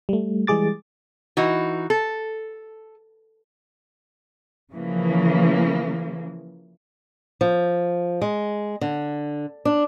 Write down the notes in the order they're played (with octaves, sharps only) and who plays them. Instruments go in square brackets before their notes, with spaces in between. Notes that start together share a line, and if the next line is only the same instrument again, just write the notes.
[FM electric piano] G3 A3
E3 G3 G#3 G#4 D6 A6
[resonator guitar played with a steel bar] E3 D#4 F#4
A4
[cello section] C#3 E3 F3 A#3
[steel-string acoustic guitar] F3
G#3
D3
D4